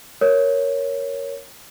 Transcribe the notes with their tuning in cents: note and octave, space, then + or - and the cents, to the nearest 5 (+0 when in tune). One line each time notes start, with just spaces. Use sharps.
A#4 +0 C#5 +0